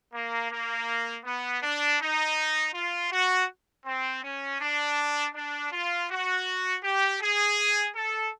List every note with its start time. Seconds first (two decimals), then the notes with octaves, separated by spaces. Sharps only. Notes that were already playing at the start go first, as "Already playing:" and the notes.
0.14 A#3
0.51 A#3
1.25 B3
1.63 D4
2.00 D#4
2.74 F4
3.11 F#4
3.86 C4
4.23 C#4
4.61 D4
5.35 D4
5.72 F4
6.10 F#4
6.83 G4
7.21 G#4
7.96 A4